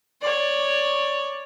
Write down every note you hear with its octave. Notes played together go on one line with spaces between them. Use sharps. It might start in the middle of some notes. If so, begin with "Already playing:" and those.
C#5 D5